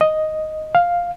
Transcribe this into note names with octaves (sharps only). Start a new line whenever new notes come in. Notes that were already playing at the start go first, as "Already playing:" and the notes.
D#5
F5